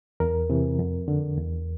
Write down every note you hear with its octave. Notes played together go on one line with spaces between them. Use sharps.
E2 A#4
C3 E3
F2
D3
E2